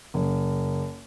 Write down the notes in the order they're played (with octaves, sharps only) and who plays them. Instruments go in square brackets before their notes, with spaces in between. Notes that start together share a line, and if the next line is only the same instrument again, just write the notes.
[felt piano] F#1